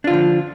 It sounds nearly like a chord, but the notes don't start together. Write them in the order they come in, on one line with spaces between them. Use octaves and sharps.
D4 F4 D3 F3